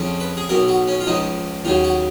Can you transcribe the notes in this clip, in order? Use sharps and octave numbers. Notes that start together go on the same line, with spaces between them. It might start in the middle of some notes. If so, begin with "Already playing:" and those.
Already playing: F2 C#3 F3
B4
G#4
B1 B2 F#3 A#4
F#4
C#4
F4
C#2 C#3 F3 D#4
D#2 C#3 F#3 F4
F#4